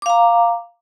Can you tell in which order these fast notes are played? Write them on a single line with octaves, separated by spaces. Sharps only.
D6 F5 A#5